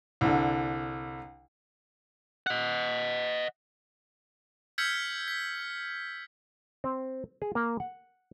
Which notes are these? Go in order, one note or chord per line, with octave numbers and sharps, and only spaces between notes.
C2 D3
D#5 F#5
E6 F6 G6 G#6 B6 C#7
B6
C4
G#4
A#3
F#5